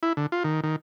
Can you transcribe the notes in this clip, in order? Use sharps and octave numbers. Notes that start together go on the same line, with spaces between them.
E4
D3
F4
D#3
D#3